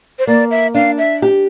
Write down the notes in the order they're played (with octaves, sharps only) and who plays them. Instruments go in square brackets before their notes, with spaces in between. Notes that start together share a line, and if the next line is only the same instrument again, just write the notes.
[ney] C5
[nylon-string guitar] A#3 [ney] D5
[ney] E5
[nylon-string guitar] D4 [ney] F5
[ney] E5
[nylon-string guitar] G4